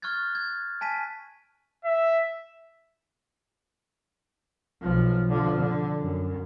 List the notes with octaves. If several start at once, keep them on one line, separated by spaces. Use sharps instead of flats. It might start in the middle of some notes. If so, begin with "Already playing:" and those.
C#6 F6 F#6 G#6 A6
G#6
G#5 A5 B6 D#7
E5
B1 F3
D3 F3
D3
F#2